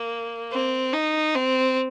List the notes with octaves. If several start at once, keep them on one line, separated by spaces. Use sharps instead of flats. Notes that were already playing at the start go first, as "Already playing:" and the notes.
Already playing: A#3
C4
D#4
C4